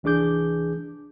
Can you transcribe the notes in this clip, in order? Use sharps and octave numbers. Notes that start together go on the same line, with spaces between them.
C2 E3 D4 G#4 D6 G6